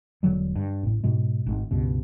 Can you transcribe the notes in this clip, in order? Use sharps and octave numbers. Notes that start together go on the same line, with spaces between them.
E1 D3 F#3 G3
G2
A1 A2
G#2 B2 G#3
G#1 G#2
C#2 G2 B2